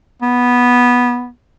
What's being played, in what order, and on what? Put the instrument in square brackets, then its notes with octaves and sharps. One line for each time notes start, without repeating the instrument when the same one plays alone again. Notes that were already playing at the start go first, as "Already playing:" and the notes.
[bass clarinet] B3